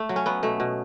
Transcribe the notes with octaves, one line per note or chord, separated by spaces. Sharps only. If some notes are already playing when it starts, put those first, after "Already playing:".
Already playing: A3 A4
F#3
C#4
F#3 B3
B2 A3
B2